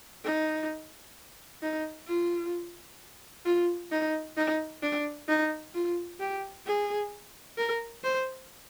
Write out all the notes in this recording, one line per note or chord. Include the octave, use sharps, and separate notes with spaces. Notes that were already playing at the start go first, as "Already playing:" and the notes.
D#4
D#4
F4
F4
D#4
D#4
D4
D#4
F4
G4
G#4
A#4
C5